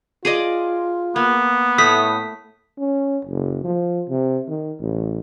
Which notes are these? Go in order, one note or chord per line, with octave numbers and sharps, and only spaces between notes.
F4 G#4 D5 D#5
A#3 B3
A2 A3 D#6 B6
C#4
F#1
F3
C3
D#3
A1